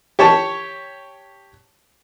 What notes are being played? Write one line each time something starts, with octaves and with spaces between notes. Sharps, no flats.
G4 C#5 A5 C#6